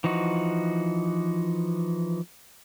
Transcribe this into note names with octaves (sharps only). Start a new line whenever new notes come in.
E3 F3 D#4 F#4